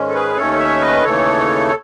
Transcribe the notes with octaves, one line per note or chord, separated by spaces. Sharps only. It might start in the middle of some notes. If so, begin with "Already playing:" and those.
Already playing: G#2 D#3 G#3 C#4
A4
G#4 B4
D#2 D#3 A3 C#4 A4 C#5
C#5 E5
B4 D#5
D#2 C#3 E3 A3 A4 C#5
C#5